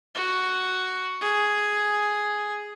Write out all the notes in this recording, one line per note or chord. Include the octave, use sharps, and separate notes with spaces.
F#4
G#4